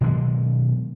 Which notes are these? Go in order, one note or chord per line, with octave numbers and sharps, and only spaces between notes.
B2 D#3 F#3 G#3